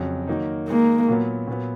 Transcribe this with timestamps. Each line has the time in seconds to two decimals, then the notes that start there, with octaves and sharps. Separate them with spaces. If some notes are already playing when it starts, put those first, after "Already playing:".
Already playing: F2 C#3 F#3
0.27 D#3 F#3 A#3 D#4
0.68 D#3 G#3 A#3 D#4
1.09 A#2 F#3 B3
1.47 A#2 F#3 B3